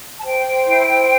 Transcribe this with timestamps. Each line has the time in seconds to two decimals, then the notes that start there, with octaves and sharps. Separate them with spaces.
0.19 A5
0.23 C5 G5
0.46 C5
0.66 E4
0.89 C5